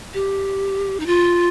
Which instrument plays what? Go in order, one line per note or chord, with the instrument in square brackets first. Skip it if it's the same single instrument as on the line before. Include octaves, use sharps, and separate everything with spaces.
[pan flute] G4
D#4
F4